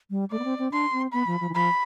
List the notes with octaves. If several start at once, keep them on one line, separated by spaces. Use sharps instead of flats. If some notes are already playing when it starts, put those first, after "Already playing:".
G3
A3 D5
B3
C4
C4
D4 C6
C4
B3 B5
F3
F3
E3
F3 B5